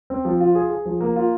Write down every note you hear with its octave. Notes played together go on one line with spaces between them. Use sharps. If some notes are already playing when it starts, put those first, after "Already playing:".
C4
F3
F4
G#4
G#4
F3
A#3
F4